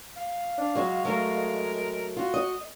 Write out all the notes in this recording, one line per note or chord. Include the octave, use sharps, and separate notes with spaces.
F5
D4
F#3 G#3 F#4
F#3 A3 A#4
F4 F#4
D#5